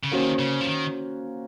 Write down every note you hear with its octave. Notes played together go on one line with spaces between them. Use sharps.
C#3
D#3 A#3 C#4 F#4 C5
C#3
F3
D#3